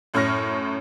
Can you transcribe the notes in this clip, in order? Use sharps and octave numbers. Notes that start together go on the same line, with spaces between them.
F#2 A2 C#5 C#6 F6 A#6